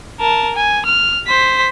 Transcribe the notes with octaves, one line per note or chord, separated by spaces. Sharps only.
A#4 A5
G#5
F6
C5 B6